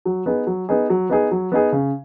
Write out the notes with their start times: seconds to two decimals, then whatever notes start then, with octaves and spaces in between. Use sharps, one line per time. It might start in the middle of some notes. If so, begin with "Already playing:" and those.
0.05 F#3
0.26 B3 D#4 G#4
0.47 F#3
0.69 B3 D#4 G#4
0.90 F#3
1.10 B3 D#4 G#4
1.31 F#3
1.52 B3 D#4 G#4
1.72 C#3